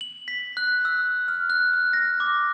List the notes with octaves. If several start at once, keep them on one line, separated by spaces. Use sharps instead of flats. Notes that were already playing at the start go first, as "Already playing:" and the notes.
F#7
B6
F#6
E6
F6
F#6
F#6
A#6
D6